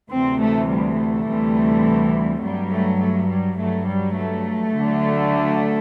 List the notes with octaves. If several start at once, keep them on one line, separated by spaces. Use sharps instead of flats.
D2 C3 E3 C4
A3
G3
A3
D2 C3 E3 G3
G2 F#3 G3
A3
A3
G3
G2 F#3 A3
G3
A3
D2 D3 F#3